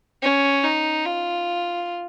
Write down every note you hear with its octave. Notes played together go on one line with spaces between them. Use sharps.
C#4
D#4
F4